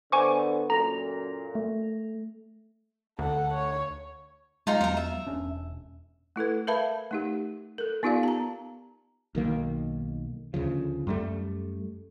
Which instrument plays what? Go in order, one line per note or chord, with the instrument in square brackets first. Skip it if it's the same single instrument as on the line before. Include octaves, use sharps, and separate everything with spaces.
[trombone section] D3 B3 [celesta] C5 [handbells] G#5 C#6 D6
[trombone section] F#2 A#2 [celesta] A4 A#6 F7 [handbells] A#5
[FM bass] A3
[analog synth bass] D2 [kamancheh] A4 F#5
[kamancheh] C#5
[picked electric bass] G#3 [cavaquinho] D#4 F4 A#5
[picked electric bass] E2 F#3 B3 [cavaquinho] A#4 A#5
[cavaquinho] E5
[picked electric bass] E1 C#4 D4
[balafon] A3 E4 A4 B4
A#4 B4 E5 F5 A5 B5
A3 D#4 G4
A4 A#4
B3 D#4 F4 G4 D5 F5
A5 A#5
[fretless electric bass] B1 D#3 A#3
D2 C#3 F3
F#2 G3 A3